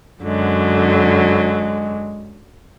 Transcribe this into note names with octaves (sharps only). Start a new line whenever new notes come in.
F#2 D3 F#3 G#3